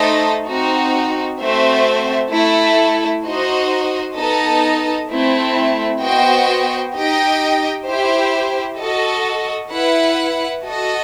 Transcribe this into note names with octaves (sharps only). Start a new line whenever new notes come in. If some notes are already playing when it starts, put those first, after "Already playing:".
Already playing: A3 D#4 A4 C5 D#5
C4 D#4 F#4
A3 C4 F#4 C5 E5
A3 E4 A4
D#4 F#4 C5 D#5
B3 D#4 A4 D#5 A5
A3 C4 E4
B3 F#4 C5 D#5 G5
D#4 G4 D#5 G5
E4 G4 C5
F#4 A4 D#5
E4 B4 F#5
F#4 A4 D#5